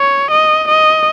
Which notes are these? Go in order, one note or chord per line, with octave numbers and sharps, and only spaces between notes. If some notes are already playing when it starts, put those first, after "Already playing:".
Already playing: C#5
D#5
D#5